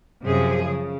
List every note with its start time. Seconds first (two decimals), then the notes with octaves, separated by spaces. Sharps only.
0.24 F#2 C3 F3 G#4
0.67 C#3